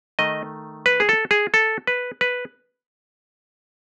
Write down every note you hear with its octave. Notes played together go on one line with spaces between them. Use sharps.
D#3 A3 D#5
B4
G#4
A4
G#4
A4
B4
B4